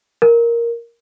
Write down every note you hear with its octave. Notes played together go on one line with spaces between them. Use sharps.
A#4